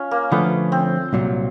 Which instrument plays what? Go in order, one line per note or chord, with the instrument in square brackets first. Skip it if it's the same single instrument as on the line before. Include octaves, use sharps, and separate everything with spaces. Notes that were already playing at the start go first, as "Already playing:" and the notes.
Already playing: [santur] C#4 F4
A#3
[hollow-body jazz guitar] D3 F3 A3 [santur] B3
[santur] C4
[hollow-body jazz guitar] C2 A#2 F#3